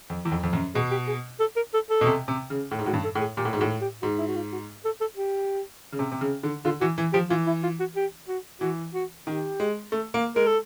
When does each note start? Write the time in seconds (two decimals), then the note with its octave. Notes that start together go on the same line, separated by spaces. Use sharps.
0.10 F2
0.25 E2
0.31 F2
0.43 F2
0.53 F#2
0.75 B2 G#4
0.91 G4
1.08 G#4
1.40 A4
1.56 A#4
1.74 A4
1.90 A4
2.01 B2
2.06 C3
2.28 C3
2.50 C#3
2.71 A2
2.79 G#2
2.86 A2 F#4
2.93 G2
3.04 A4
3.15 A2
3.21 G#4
3.37 A#2 G4
3.45 A2
3.53 G#2
3.59 A2 F#4
3.81 G4
4.02 G#2 F#4
4.19 E4
4.28 F#4
4.36 F4
4.52 F#4
4.85 A4
5.01 A4
5.17 G4
5.92 C#3
5.99 C3
6.12 C3
6.21 C#3
6.43 D3
6.65 D3 F4
6.81 E3 F#4
6.98 E3
7.13 F3 G4
7.30 E3 F4
7.47 E4
7.63 F4
7.80 F#4
7.96 G4
8.28 F#4
8.61 E3 F#4
8.94 F#4
9.27 D#3 G4
9.60 G#3
9.92 A3
10.14 A#3
10.36 G#3 A#4
10.47 A4